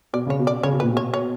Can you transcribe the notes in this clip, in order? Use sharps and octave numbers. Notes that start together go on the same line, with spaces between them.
B2 D5
C#3 C#5
B2
D5
C#3 C#5
B2
A#2 B4
B2 C#5
C#5